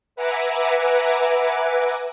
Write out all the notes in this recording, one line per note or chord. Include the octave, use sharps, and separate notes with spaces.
B4 E5 F#5 G#5 A#5 D6